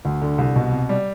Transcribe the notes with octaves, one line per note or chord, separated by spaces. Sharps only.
D2
D3
C2
B2
C3
G3